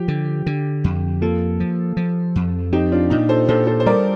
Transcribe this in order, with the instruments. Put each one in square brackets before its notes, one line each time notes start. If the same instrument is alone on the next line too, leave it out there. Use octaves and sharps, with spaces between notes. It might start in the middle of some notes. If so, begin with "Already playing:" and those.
Already playing: [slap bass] F3 [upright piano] G4
[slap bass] D3
D3
F2
[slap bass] A#3 [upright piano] F4 A4
[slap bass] F3
F3
F2
[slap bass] C4 [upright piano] D#4 G4
[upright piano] D4 F4
[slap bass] A#2 [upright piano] D#4
[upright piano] A4 C5
[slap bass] A#2 [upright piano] A4 C5
[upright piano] A4 C5
C5
[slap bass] G3 [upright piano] A#4 D5